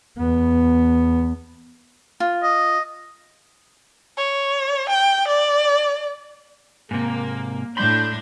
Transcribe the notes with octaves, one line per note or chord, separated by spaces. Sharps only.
E2 B3
F4
D#5
C#5
G5
D5
G#2 C3 A#3
A2 D4 B5 C6 G6